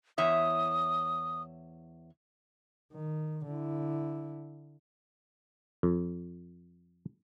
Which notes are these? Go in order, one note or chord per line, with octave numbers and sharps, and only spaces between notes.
E2 C#5 E5 D#6
D#3
D3 E4
F2